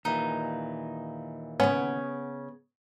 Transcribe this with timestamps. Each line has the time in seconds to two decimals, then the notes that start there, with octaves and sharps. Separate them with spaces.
0.05 D#2 A#2 E3 D#4
1.60 C#3 B3 C#4